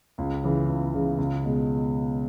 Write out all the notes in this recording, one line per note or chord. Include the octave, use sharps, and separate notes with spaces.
C#2
C#3 E3
C#2
C#3 E3
C#2
B2 G#3